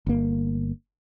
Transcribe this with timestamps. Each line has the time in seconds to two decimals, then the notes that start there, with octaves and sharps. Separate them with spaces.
0.07 G1 A#3